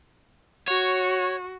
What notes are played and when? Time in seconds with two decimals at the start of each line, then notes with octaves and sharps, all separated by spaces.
0.68 F#4 C#5